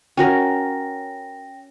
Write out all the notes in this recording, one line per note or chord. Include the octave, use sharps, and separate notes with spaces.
C#4 F#4 A#4 G5 A#6